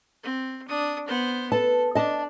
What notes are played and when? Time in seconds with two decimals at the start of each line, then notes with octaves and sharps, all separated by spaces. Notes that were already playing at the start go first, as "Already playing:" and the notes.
0.23 C4
0.68 D4 D#6
1.08 B3 C5
1.52 A4 B4 A5
1.95 D4 D#5 A5